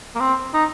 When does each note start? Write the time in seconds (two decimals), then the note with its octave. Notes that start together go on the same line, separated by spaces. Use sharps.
0.15 A#3
0.20 C4
0.54 D#4